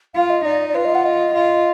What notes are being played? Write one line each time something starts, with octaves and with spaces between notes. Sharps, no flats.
F4 F5
D#5
D#4 D5
D5
F4 B4
D#5
F#5
D#5
F4